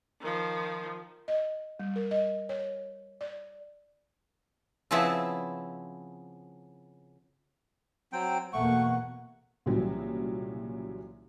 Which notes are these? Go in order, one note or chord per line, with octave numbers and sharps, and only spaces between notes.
D#3 F3
D#5
G3
A#4
D#5
C#5
D5
C#3 F3 B3 C4 E4 A5
F#3 C4 G5
E2 B2 A3 A#3 F#5 C#6
C2 A#2 C#3 E3 F#3 G3